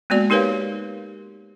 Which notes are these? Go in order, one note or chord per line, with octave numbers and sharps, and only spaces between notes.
G#3 A#3 B3 F#4 D5
D#4 G4 A#4 B4 C#5 F5